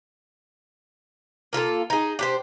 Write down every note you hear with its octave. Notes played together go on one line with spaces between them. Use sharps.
A#3 F4 G#4 A4
D#4 G#4
D4 G4 C5